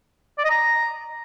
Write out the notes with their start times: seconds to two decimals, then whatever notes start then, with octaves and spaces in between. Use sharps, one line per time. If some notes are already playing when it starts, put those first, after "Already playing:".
0.38 D5
0.44 D#5
0.50 A#5